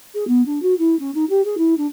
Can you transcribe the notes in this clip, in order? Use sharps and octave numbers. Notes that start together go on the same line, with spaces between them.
G#4
B3
D4
F#4
E4
C#4
D#4
G4
G#4
E4
D4